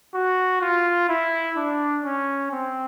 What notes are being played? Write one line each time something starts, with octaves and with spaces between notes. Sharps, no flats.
F#4
F4
E4
D4
C#4
C4